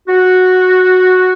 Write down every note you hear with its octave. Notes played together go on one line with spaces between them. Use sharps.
F#4